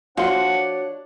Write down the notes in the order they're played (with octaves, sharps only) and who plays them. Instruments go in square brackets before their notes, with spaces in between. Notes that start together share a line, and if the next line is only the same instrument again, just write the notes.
[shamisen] F3 A#3 F4 [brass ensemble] D4 C#5 [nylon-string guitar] F#4 F5 [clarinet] F#5